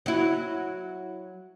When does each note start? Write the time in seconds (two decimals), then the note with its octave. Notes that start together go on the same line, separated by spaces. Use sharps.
0.06 F#3 E4